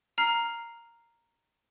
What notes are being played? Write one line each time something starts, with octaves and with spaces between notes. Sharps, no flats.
A#5 F6 C7